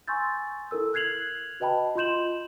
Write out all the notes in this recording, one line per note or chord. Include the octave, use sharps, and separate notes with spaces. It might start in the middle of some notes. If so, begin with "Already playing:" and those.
G#5 C6 C#6 E6 G6 A6
E4 A4 A#4 E6
F6 F#6 G#6 C7 F7 F#7
F#4 B4 D#5 G5 A5 B5
F4 D#5 C6 G6 E7 F#7